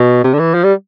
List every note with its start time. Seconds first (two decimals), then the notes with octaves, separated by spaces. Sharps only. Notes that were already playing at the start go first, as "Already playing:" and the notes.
Already playing: B2
0.24 C3
0.34 D3
0.39 E3
0.55 F3
0.64 G3